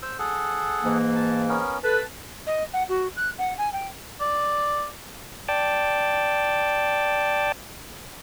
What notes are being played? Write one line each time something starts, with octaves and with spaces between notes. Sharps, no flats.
C5 E6
G#4 A4 F#5
G#2 E3 A#3
A5
B3 C#4 A#4
A4 B4 A5
D#5
F#5
F#4
F#6
F#5
G#5
G5
D5
D5 G5 A5